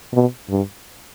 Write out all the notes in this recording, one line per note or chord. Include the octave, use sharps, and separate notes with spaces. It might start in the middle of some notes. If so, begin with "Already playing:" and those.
B2
G2